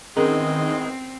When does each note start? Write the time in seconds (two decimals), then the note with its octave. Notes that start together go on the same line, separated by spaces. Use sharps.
0.17 E2 D#3 G#3 C4 C#4 G#4 A#4 D#5